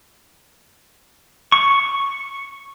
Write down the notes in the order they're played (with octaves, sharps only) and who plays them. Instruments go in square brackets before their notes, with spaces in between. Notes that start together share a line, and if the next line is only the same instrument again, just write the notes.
[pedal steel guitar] C#6